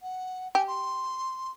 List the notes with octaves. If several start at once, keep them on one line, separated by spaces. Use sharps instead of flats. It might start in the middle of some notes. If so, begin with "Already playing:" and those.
F#5
G4 G#5
C6